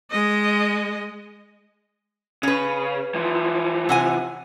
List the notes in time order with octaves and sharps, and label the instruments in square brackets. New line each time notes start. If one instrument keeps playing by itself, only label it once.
[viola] G#3 D#5
[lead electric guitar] C#3 [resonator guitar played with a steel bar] C#4 B4
[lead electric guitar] E3 F3
[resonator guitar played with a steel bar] C3 F#5 G#5